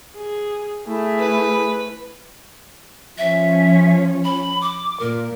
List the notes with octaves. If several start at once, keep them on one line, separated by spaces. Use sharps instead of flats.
G#4
A3 E4 G#4
B4
F3 C#4 E5
B5
D6
A#2 A#4